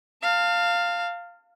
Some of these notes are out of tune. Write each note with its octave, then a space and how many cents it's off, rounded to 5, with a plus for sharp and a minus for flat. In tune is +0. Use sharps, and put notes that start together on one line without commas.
F5 +0 A5 +40